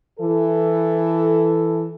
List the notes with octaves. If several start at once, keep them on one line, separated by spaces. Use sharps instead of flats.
E3 A4